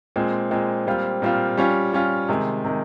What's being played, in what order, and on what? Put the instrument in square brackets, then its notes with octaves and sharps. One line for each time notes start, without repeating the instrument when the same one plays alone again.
[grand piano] A#2 G#3 C4
A#2 G#3 C4
A#2 G3 C4 F4
A#2 G3 C4 F4
G3 C#4 F4
G3 C#4 F4
C3 D#3 G#3
C3 D#3 G#3